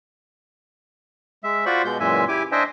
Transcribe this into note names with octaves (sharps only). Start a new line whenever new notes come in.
G#3 E5
F4 F#4 C5 D5 B5 C#6
B2 G#3 G6
F#2 A#2 E3 G#3 E5 G#5
E4 G4 G#5 D6
D4 C5 D#5 E5 G5 G#5